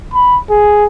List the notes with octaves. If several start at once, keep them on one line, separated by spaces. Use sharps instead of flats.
B5
G#4